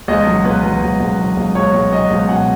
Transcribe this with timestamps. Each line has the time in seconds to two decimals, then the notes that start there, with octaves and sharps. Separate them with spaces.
0.08 C#2 D#5
0.27 F#3
0.44 C#2 B4
0.63 F#3
0.82 C#2
1.00 C#2
1.18 F#3
1.37 C#2
1.55 C#2 C#5
1.74 C#2
1.92 F#3 D#5
2.10 C#2
2.29 B2 F#5